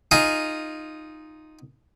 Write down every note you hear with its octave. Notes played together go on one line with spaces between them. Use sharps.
D#4 F4 G#4